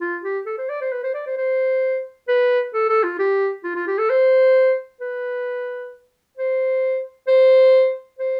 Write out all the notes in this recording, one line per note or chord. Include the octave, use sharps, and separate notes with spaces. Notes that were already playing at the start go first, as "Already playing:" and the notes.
F4
G4
A4
C5
D5
C5
B4
C5
D5
C5
C5
B4
A4
A4
F4
G4
F4
F4
G4
A4
C5
B4
C5
C5
C5